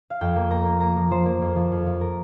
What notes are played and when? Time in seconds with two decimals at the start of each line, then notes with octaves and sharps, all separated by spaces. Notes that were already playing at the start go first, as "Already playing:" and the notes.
0.10 F5
0.21 F2 G5
0.36 A#3
0.50 A#3 A#5
0.65 A#3
0.80 A#3 A#5
0.96 F3
1.11 F3 C5
1.26 A#3
1.41 F2
1.56 F3
1.72 F2
1.86 F3
2.01 A#4